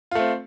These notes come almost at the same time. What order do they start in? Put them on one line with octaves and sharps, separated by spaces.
F4 A3 C4